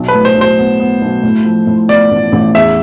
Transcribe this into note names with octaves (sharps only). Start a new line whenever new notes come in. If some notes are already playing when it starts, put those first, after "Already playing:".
Already playing: B1
B4
A2
C5
B1
C5
B3
B3
B1
A2
F3
A2
B3 D5
A1
A1
E2 E5